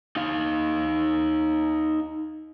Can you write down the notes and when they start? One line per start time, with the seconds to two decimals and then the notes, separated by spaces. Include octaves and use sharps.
0.16 D#4 F5